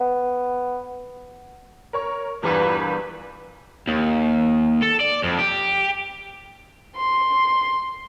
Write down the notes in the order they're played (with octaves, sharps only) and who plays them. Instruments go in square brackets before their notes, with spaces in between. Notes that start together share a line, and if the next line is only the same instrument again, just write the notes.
[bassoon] B3
[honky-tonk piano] A#4 C#5 C#6
[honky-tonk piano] E2 G2 [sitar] A#2 E3 G3 [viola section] B4
[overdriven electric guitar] D#2
A4
D5
F2
G4
[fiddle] C6